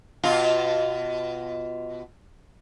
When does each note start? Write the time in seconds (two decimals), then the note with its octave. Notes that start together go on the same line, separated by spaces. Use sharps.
0.24 B2 F4